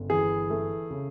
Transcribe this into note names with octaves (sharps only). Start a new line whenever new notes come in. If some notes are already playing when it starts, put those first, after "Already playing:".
Already playing: G1 C#3
E3 G#4
A3
C#3